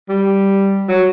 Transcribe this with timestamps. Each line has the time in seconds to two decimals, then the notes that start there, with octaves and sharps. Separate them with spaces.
0.09 G3
0.88 F#3